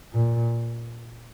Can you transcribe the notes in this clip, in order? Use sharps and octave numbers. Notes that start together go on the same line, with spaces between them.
A#2